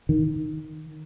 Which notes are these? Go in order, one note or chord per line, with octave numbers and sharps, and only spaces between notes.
D#3